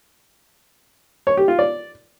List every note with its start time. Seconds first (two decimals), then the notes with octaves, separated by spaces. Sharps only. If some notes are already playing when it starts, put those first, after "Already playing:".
1.27 C#5
1.37 G4
1.48 F4
1.59 D5